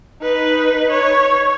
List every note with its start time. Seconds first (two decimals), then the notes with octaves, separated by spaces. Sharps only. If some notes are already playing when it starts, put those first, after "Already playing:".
0.22 D#4 B4
0.91 C#5